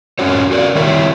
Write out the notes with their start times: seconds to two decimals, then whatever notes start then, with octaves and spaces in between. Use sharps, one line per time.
0.19 C#4 F4 F#4 C#5
0.51 F#4 A#4 D5
0.75 D#3 G3 E4 C#5